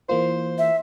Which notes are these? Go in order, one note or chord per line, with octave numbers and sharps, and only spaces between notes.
E3 A#3 F4 C5
E5